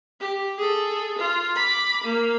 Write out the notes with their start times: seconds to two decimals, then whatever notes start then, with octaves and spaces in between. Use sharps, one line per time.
0.20 G4
0.58 G#4 A4
1.18 F4
1.55 B5 D6
2.04 A#3